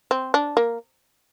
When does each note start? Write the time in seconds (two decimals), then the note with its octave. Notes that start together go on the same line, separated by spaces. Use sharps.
0.11 C4
0.34 D4
0.57 A#3